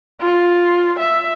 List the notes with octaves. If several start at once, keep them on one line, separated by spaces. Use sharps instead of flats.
F4
E5